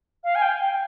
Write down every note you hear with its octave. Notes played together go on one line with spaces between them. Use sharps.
F5
G#5
G5